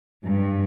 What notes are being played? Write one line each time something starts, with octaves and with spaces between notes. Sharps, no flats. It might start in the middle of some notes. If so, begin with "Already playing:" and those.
G2